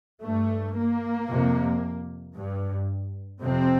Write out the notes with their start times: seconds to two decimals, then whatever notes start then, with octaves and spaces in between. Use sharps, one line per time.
0.23 G2 A3
0.76 A#3
1.30 F2 C3
2.36 G2
3.42 F2 C3 C4